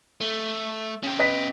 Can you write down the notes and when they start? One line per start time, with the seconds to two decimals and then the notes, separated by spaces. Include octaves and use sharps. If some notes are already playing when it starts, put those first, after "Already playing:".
0.21 A3
1.03 C#3 G4
1.19 B4 D#5 B6